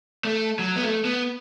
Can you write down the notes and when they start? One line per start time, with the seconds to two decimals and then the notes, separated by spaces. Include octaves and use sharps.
0.25 A3
0.59 F#3
0.76 B3
0.82 A3
1.05 B3